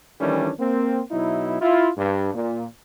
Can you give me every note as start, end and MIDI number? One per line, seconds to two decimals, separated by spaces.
0.20 0.50 51
0.20 0.50 52
0.20 0.50 55
0.20 0.50 57
0.20 0.50 61
0.20 0.50 62
0.59 1.00 58
0.59 1.00 60
1.11 1.59 47
1.11 1.59 54
1.11 1.59 63
1.11 1.59 64
1.61 1.89 64
1.61 1.89 65
1.97 2.31 43
2.34 2.64 46